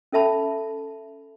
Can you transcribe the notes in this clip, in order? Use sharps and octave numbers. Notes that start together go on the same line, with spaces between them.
C#4 A4 E5 A5 B5